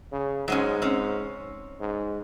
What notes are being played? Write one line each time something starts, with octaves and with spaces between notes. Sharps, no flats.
C#3
G#2 F#3 G#3 C#4
C4 C#4
G#2